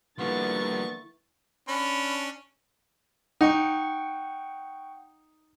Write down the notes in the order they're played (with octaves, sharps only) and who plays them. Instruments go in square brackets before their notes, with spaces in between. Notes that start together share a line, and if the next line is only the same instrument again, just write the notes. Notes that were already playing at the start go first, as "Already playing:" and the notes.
[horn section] D3 A#3 B3 [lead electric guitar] F3 G3 [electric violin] E4 A6 [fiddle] C#6
[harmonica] C#4 D4 [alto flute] B5
[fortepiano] D#4 [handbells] F#5 G5 C#6